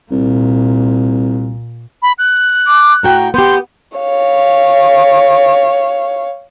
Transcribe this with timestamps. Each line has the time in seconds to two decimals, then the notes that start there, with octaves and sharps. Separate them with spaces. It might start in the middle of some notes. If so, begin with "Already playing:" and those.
0.11 C2 A#2
2.02 B5
2.18 F#6
2.66 D6
3.03 A2 F#4 G5 A#5
3.34 B3 G4 C6 G6
3.98 C#5 F5